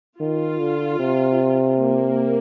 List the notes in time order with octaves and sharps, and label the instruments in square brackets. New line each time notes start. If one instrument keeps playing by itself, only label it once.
[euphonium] D#3 [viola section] F4
[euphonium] D3
C3
[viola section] A#3